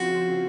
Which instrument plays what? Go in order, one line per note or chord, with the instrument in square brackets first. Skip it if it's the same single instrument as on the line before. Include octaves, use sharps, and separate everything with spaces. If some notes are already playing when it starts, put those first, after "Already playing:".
Already playing: [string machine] C#3 F3 C4 F4 C5 [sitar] F#4